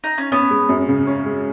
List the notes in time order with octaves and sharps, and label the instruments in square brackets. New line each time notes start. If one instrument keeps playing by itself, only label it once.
[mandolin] D#4
C#4
[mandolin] B3 [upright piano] C#4
[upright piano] G#3
F#2
C#3
C#4
G#3